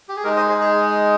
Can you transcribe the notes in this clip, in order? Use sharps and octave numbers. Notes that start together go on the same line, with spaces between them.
G4
G#4
G#3 D#4 G4 A#4
C5 D#5
G#4 C5
G#4